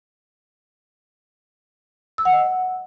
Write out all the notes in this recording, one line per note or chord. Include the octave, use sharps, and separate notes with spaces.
E6
F#5
D#5